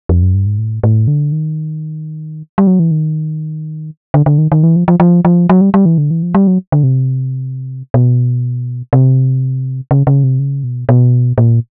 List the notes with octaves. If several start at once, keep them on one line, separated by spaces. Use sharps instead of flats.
F2
F#2
G2
G#2
A2
A2
D3
D#3
G3
F#3
E3
D#3
D3
D3
D#3
D#3
E3
F3
F3
F3
F3
F#3
G3
G3
E3
D3
E3
F3
G3
F#3
D3
C3
B2
C3
C#3
C#3
C3
C#3
B2
B2
A#2